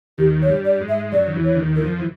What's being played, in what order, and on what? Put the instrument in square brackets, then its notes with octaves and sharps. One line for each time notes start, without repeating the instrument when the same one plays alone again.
[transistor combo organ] D#2 D#3 [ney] G4
[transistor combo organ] F#3 [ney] C#5
[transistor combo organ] G2 G3
[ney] D5
[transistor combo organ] G#2 G#3
[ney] E5
[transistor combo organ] F#2 F#3 [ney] D5
[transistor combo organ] D#3
E2 E3
[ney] C#5
[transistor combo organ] D3
D#2 D#3
[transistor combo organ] E3 [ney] A#4
[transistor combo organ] F2 F3
E3